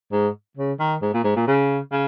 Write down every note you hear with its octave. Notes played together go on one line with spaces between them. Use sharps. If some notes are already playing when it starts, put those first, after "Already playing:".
G#2
C#3
D#3
G#2
A#2
G#2
A#2
C#3
C#3